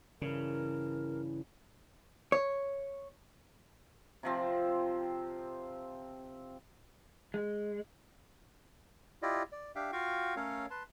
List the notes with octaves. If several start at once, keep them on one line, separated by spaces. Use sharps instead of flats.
G2 C#3 E3 A#4
C#5
C3 F3 C4
G#3
E4 F4 G4 D5 D#5
D5
D4 G4 E5 F5 G5
F4 F#4 F5 G5 C#6
A3 C#4 A4 A#4 C#5 F5
B4 A5 C6